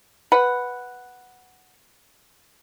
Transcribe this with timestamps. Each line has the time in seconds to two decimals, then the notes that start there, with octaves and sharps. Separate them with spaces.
0.32 B4 F#5